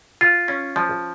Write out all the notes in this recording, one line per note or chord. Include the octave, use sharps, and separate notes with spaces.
F4
C#4
F3